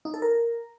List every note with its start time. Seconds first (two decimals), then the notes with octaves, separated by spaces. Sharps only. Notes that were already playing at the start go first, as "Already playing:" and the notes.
0.05 D#4
0.14 A4
0.22 A#4